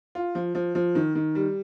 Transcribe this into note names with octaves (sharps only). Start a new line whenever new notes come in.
F4
F3
F3
F3
D#3
D#3
G3